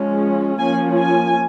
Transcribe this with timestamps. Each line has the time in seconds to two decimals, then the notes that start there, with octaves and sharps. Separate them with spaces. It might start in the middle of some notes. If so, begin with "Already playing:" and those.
Already playing: F3 G#3 C#4
0.59 F3 A#3 C#4 G#5
0.97 G#5